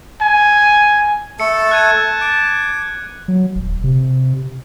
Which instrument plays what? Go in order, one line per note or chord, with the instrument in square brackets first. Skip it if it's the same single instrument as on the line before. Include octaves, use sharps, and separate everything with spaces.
[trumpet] G#5
[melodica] A3 A4 [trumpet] A5 [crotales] C#7
[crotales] F#6 G#6 D#7
[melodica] D6
[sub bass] F#3
D#1
C3